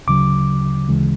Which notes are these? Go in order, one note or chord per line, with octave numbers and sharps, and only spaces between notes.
D2 C#3 F#3 D6
D2 C#3 E3 G#3